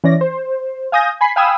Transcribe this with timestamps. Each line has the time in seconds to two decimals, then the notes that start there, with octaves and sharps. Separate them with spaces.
0.04 E3 C#4 D5 A#6
0.21 C5
0.92 F5 G#5 D#6 G6 A#6
1.21 G#5 B5 B6 C7
1.36 F5 G5 G#5 B5 D#6 E6